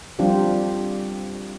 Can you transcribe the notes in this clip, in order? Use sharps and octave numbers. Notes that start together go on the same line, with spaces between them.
F3 G3 C4 D4 F4 G4